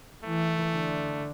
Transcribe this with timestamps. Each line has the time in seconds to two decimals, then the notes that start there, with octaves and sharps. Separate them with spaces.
0.24 E3 A3
0.75 D3